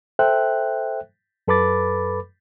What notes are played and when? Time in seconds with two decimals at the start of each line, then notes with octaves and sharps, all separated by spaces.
0.19 A4 C5 E5 G5 F#6
1.48 F#2 A4 B4 B5 D6 A6